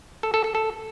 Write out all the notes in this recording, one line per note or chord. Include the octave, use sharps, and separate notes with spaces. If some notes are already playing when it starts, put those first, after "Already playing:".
A4
A4
A4
A4